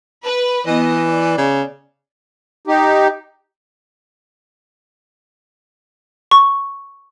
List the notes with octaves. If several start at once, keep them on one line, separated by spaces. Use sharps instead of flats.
B4
E3 B3 D#5
D5
C#3
D#4 G4
C#6